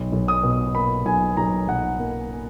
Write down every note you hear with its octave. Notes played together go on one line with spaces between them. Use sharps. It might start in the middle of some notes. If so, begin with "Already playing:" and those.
Already playing: B1
B1
D#6
B2
A#3 B5
B1 G#5
B1 A#5
B1 F#5
A#3
A#3